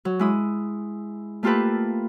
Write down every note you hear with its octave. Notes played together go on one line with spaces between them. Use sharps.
F#3
G#3 E4 D#6
A3 A#3 F4 G4 A4 B4